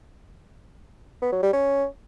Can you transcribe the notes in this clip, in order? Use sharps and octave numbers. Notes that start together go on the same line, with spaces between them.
B3
F#3
G3
C#4